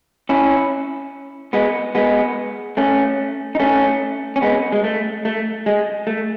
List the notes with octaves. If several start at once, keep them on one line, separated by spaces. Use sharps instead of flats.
C#4 E4
G#3 B3
G#3 B3
A3 C#4
D#4
A3 C#4
C#4
G#3 B3
G#3
A3
A3
G#3
A3